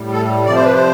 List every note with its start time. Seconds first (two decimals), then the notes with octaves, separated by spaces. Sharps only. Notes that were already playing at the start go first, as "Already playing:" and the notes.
Already playing: A2 G3
0.12 A4
0.46 C3 F3 D5
0.55 C5
0.64 B4
0.74 C5